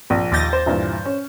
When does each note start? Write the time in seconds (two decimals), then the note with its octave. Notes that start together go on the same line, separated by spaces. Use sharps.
0.10 A#1
0.32 D#2 D6 G6 A6 A#6
0.53 C5
0.66 G2 A#2 E3
1.05 C#4